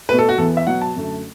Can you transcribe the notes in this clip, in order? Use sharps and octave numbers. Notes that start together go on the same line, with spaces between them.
B2 A3 B4
A4
F#4
E2 E3 B3 A4
E5
B2 F#3 B3 F#5
A5
F#2 D3 A3